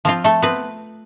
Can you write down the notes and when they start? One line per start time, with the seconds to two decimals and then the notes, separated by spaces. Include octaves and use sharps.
0.05 F3 C4 F4
0.24 A3 A4
0.42 B3 C4 B4